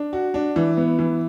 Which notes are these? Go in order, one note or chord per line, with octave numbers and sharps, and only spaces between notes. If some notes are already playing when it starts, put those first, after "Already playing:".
Already playing: D4
F#4
D4
E3
B3
E3